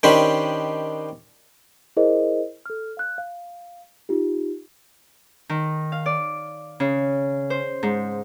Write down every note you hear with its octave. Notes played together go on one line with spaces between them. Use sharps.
D#3 C#4 D4 G4 C5 B5
E4 G#4 A#4 C5 D#5
A4 F6
F5 F#6
F5
D#4 F4 G4
D#3
F5
D5
C#3
C5
G#2